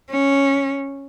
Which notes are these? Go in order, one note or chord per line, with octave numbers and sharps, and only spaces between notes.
C#4